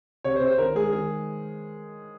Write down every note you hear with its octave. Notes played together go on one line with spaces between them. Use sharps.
C3 C#5
C5
C3
C5
D#3 A#4
G#3 G#4
D#3 G#4